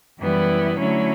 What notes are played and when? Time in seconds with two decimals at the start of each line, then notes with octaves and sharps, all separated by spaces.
0.18 F#2 E3 G3 B3 E4
0.78 D3 F#3 A3 C#4 E4